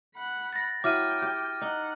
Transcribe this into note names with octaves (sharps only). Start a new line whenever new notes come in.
F#5 B5
A6 A#6
F#3 E4 G5 D6 F6 D#7
G4
D#4 F#5